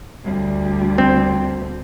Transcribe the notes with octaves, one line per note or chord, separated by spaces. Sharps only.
D2 G3
C4